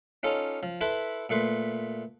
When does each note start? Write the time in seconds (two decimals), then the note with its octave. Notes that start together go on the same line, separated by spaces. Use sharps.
0.23 C#4 D#4 F4 A4
0.63 F3
0.81 E4 A4 B4 C5
1.29 A#2 A3 B4 C6